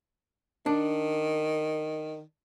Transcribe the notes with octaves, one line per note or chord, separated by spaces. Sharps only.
D#3 D4